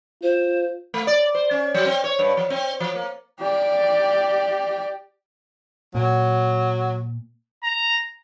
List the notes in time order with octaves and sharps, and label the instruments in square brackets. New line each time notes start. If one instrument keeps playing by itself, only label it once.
[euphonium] F4 [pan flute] C5
[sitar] A3
D5
C5
C#4
F#3
C4
C#5
G2
F3
C4
F3
A#3
[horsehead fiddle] G4 D5
[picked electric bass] A#2 [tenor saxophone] F#3
[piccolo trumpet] A#5